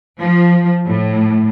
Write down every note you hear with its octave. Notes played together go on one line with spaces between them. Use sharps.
F3
A2